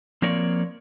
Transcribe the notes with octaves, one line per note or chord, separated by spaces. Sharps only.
F3 A#3 C4 A#4 C#5 D5